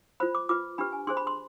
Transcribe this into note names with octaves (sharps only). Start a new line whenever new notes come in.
F4 C5 B5
D6
F4 B4 D6
D4 G4 B4 B5
G#5
D4 G#4 C5 C6
B5
C6